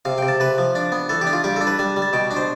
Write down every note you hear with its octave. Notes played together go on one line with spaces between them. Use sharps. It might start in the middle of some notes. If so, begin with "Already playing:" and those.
C3 F5
C3 G5
A5
C3 B4
F3
D4
B3
E3 A4
G4
D4
F4
G3 G4
D4 A4
B4
G3 A5
G3
A5
B2 G5
D4
C5